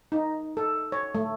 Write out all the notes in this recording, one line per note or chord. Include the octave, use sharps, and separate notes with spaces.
D#4
A4
C#5
A3